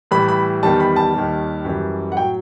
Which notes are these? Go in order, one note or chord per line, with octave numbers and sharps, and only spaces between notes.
A2 E3 G3 B5
B5
E2 D#3 G3 A5
B5
A5
D#2 D#3 G3
F#2 E3 G3
F#5
A2 F#3 G5